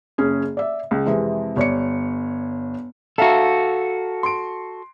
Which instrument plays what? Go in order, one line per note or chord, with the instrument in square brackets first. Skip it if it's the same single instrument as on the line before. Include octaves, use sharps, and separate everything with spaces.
[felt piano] F#1 C#4 G#4
D5 E5
C#2
F2 C3 E3 G#3
G1 C#5 D5 C#7
[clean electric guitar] F#4 A4 [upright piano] E5 F5 A#5
[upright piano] C6 D7